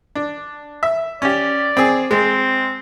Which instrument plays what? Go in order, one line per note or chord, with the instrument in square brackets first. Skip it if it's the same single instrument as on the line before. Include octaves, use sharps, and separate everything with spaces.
[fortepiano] D4
E5
[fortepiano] C#4 G4 [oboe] D5
[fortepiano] C4 G#4
[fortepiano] G#3 [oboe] C4